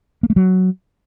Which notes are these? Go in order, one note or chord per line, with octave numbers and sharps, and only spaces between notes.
A#3
A3
F#3